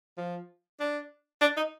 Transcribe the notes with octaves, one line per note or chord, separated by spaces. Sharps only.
F3
D4
D4
D#4